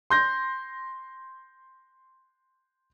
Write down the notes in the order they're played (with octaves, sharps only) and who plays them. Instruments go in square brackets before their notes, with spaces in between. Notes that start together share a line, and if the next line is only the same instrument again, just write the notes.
[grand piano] C6 G6 A#6